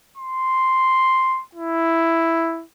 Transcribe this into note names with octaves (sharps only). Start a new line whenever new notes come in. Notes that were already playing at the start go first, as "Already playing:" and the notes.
C6
E4